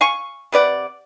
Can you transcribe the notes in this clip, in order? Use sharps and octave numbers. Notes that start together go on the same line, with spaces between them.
F5 G#5 C#6
C3 B4 D5 F#5